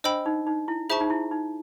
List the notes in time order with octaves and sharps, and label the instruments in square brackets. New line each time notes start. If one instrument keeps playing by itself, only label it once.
[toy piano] D4 [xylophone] C5 D#5 G5 B5 E6
[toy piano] D#4
D#4
E4
[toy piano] F4 [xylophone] G#4 C5 E5 A5 C#6
[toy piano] D#4
E4
D#4